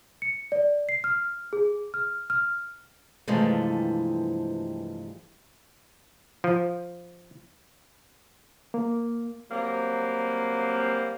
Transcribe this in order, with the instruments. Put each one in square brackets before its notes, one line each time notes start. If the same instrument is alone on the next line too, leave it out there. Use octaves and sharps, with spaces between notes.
[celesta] C#7
D5
C7
F6
G#4
F6
F6
[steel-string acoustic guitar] G2 C3 E3 F3 G#3 A3
[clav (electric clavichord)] F3
[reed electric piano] A#3
[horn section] F#3 G3 A#3 C4